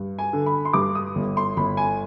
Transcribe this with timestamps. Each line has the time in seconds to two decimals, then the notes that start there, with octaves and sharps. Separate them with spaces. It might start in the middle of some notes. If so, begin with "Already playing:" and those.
Already playing: G2
0.19 G#5
0.33 D3
0.46 B5
0.65 C6
0.73 G2 D6
0.95 D#6
1.16 G1
1.37 C6
1.57 G1 B5
1.77 G#5